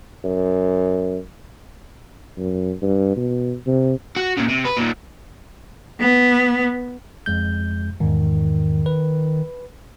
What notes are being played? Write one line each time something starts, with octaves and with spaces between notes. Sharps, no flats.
F#2
F#2
G2
B2
C3
F#4
A#2 C#3
C3
B4
D#2 A#2
B3
F2 G#3 G6
E2 G#2 D#3
B4